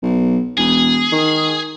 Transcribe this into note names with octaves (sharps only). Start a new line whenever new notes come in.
B1
E1 G#4
D#3